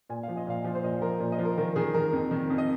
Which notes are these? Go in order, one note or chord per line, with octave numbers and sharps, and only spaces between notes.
A#2 G#5
F3 F5
D#5
A#2 F5
F3
C5
A#2 D#5
F3 A#4
A#2
D#5
F3
A#4
D#3 A#4
D#3 G#4
D#3 A#4
F2
D#3
F2
D#5